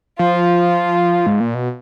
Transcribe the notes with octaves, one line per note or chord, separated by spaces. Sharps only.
F3 F4
G#2
A#2
B2